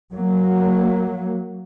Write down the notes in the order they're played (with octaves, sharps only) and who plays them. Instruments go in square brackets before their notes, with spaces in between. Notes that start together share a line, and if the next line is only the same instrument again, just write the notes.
[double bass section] F#3 A#3